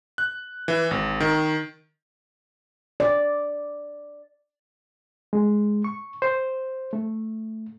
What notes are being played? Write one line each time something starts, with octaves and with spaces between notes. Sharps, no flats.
F#6
E3
G#1
D#3
D5
G#3
C#6
C5
A3